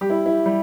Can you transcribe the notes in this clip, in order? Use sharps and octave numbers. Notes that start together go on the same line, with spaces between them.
G3 G4
E4
E4
G3